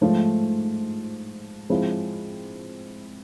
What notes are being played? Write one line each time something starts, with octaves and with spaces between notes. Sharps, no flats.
G#2 F3 A3
F3 G#3 C4 E4